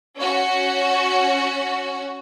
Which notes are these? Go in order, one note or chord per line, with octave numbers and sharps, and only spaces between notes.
C#4 F#4